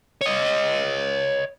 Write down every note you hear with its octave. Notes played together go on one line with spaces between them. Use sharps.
C#5 D#5